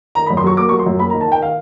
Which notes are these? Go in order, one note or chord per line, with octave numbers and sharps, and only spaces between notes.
D#3 A#5
B5
F#2
C6
F#3 C#6
A#3 D6
C#6
F#3
C6
F#2
A#3 B5
A#5
D#3
A5
D#3 G5
F5